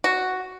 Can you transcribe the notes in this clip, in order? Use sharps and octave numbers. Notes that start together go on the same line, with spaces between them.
F#4